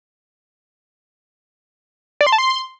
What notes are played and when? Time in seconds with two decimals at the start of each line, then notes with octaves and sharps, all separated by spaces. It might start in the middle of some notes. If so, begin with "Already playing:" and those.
2.21 D5
2.27 C6
2.32 A5
2.38 C6